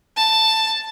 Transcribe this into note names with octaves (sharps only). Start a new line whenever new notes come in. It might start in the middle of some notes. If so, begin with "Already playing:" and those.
A5